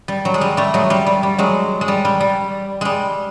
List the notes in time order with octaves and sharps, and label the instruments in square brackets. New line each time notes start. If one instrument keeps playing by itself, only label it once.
[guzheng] G3
F#3
G#3
G3
G3 A3
F#3 G#3
G3
G3
G3
F#3 G#3
G#3
G3
G3
G3
G3 G#3